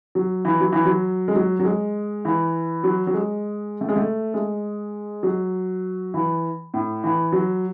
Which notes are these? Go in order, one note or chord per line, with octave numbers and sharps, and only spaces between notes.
F#3
E3
F#3
E3
F#3
G#3
F#3
F#3
G#3
E3
F#3
F#3
G#3
A3
G#3
A3
G#3
F#3
E3
A2
E3
F#3